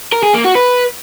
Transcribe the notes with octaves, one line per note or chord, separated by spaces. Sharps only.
A#4
G#4
A#3
F#4
B4